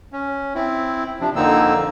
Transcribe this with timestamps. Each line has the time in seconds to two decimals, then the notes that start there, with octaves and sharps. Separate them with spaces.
0.13 C#4
0.55 C4 E4
1.20 C3 F3 D4
1.36 F2 D3 A#3 C4 D#4 E6